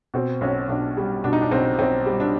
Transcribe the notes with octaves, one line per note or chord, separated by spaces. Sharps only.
B2 C4
B1 C#4
B1 D4
G3
B2 D4
D#4
D4
B1 C4
B1 C4
G3
D4